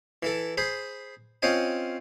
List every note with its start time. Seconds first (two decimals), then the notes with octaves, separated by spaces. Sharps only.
0.23 E3 E4 A4
0.58 G#4 C5 B5
1.42 C4 C#4 F4 C5 D#5 G#5